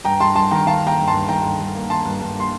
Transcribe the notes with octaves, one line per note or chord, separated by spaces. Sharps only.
G2 G5 A#5
G2 A5 C6
G2 A5 C6
D#3 G5 A#5
D#3 F5 A5
A#3
G5 A#5
G2
A5 C6
G2
D#3 G5 A#5
G2
G2
A#3
D#3 A5 C6
G2
G2
A#3 C6